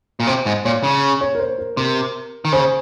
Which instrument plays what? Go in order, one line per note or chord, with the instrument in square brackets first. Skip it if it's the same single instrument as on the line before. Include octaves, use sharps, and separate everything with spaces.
[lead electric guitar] A#2
[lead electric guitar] C3 [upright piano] C5
[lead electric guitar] G#2
[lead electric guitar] A#2 [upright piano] C#5
[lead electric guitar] C#3
[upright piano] C#5
A#4
C5
A#4
[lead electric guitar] C3 [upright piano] A#4
[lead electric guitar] D#3
[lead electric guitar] C#3 [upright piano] C5